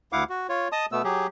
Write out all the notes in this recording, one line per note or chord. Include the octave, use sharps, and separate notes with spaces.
D2 E4 F5 F#5 D6
F#4
F4 C#5
D#5 A5 D#6
B2 A3 B3 E6
F#3 G4 G#4